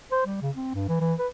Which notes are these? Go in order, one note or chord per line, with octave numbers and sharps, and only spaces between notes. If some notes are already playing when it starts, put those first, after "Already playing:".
C5
G3
C#3
C4
G2
E3
E3
B4